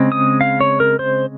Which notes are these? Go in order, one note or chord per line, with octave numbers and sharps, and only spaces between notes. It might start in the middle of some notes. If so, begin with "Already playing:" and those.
Already playing: C#3 G#3 C4
D#6
F5
C#5
A#4
C5